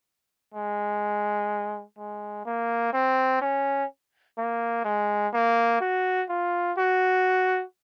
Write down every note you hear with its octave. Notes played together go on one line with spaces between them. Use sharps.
G#3
G#3
A#3
C4
C#4
A#3
G#3
A#3
F#4
F4
F#4